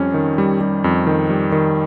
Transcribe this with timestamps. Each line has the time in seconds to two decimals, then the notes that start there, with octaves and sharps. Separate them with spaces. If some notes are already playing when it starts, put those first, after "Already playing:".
Already playing: F2 G3 C#4
0.14 D#3
0.38 G3
0.61 G3
0.84 F2
1.07 D#3
1.30 G3
1.52 D#3